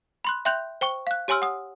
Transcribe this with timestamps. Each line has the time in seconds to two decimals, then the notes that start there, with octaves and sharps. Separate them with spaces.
0.25 B5 C6 F#6
0.45 E5 G5 C6 F#6 G6 F7
0.81 C5 G5 C#6 G7
1.07 F5 F#6
1.28 G4 C#5 G#5 C6 E6 F6
1.42 F#5 D#6